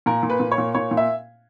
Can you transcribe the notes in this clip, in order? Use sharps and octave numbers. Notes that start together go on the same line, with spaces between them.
A#2 A#4
A#2
B4
A#2
C#5
A#2
A#2 C#5
A#2
E5